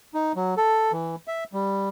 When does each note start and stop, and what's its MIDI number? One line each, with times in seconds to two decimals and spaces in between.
0.14 0.32 63
0.36 0.54 54
0.57 0.92 69
0.92 1.15 52
1.28 1.44 76
1.53 1.89 55